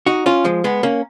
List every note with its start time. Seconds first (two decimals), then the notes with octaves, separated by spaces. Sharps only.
0.06 D#4 F#4
0.26 C#4 F4
0.45 F3 G#3
0.64 G#3 B3
0.83 A#3 C#4